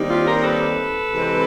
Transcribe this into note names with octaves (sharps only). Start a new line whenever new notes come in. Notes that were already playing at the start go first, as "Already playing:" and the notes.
Already playing: D#2 D#3 G3 C4 D#4
F4 G4
A#4 C5
A4 B4
C3 E3 G#3 C4